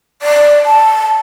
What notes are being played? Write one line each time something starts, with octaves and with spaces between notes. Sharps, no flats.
D5
A5